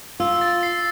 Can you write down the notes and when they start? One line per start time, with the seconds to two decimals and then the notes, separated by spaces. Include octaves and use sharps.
0.20 F4 E6
0.41 A6
0.63 C7